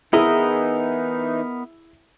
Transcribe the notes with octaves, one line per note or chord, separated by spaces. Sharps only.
E3 B3 D#4 E4 G#4 A#4 D#5